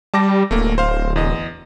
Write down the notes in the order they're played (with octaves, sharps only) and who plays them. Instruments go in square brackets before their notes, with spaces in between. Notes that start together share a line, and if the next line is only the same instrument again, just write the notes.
[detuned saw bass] G3 [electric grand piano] A5 D6 A#6
[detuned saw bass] D1 [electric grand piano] A3 A#3
[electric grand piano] C5 F5
E2 D#5